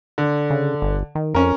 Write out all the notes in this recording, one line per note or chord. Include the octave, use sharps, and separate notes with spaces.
D3
C#3
G1
D#3
F2 C#4 A#4